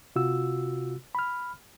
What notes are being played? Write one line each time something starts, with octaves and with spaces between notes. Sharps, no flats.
C3 F4 F#4 E6
B5 F6